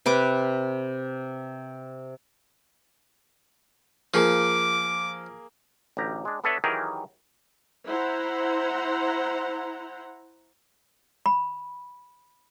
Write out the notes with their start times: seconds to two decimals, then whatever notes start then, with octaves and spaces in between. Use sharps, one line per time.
0.06 C3 B4 D6
4.14 F3 A#3 G#4 D6
5.97 A1 D2 G4 A#5
6.25 G#3 D4
6.44 B3 D4 A4 B4 C#5 E5
6.64 D#3 E3 F#3 G4 G#4 A#4
7.86 E4 C5 F#5 A#5
11.26 B5